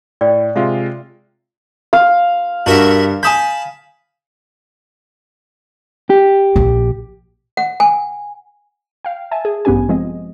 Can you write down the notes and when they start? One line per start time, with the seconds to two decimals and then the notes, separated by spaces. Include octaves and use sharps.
0.21 A2 D5 G5
0.56 C3 G#3 F4 E5 F5
1.93 F5
2.66 G2 F#4 A#4 E5
3.23 G#5 A5 B5 D#6 G6
6.10 G4
6.56 A#1
7.57 F#5
7.80 G#5
9.05 F5 G5
9.31 E5 G#5 A5
9.45 G#4
9.65 A1 G2 B3 C#4 G4 G#5
9.89 F3 G#3 C4 D#5